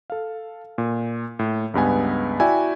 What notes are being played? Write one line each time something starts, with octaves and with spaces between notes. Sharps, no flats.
A4 F5
A#2
A2
C#2 G2 B3 G#5
E4 F#4 D5 E5 G5 G#5